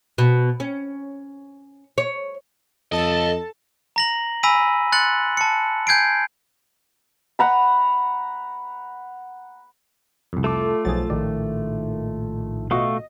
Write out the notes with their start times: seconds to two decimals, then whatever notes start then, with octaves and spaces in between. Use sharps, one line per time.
0.18 B2
0.60 C#4
1.98 C#5
2.92 F2 A4 C#5 D#5 A5
3.96 A#5 A#6 F#7
4.43 G#5 B5 E6 A#6 B6 D#7
4.92 C6 F#6 A6 C#7 F#7
5.37 A5 C#7
5.87 G#5 G6 G#6 C7 D7
7.39 F#5 A#5 B5
10.33 C2 F2
10.44 A3 F4 A4 D6
10.85 B1 F3 F#3 G#4 A6
11.10 A#1 A2 D#3 D5
12.71 B2 A3 F4 F#4 D#5 F5 C#6